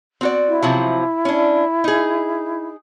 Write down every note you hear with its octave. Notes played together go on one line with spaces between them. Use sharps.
C4 F#4 D5
E4
C3 F3 F#3
C#4 D4
D#4 G#4